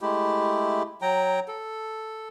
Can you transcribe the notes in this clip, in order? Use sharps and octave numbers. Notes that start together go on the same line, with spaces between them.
G#3 A3 E4 G4
F#3 G5 A#5
A4